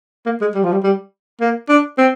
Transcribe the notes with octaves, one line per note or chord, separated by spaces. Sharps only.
A#3
G#3
G3
F3
G3
G3
A#3
D4
C4